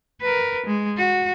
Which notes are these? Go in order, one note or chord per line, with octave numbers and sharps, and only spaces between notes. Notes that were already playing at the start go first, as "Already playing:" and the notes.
A#4 B4
G#3
F#4